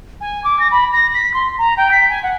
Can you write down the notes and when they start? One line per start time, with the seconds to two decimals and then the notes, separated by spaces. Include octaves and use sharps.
0.21 G#5
0.44 D6
0.59 A#6
0.71 B5
0.93 A#6
1.14 B6
1.34 C6
1.58 A#5
1.77 G5
1.91 B6
2.09 G#5
2.23 F#5